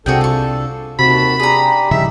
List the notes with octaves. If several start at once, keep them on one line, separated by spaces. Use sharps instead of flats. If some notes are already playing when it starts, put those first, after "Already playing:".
C2 C3 D4 F#4 G#4 A4 G5
F4 C#6
D#2 C3 F#4 A5 B5
D4 G4 G#4 A#5
A2 C#3 F3 G3 D#4 E5